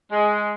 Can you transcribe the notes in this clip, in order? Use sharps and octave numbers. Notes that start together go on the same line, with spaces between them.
G#3